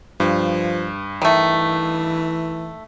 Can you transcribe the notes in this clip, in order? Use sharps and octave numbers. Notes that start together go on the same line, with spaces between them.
G2 F3
D#3 E3 A3